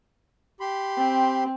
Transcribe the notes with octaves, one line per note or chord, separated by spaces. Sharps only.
G4 B5 C6
C4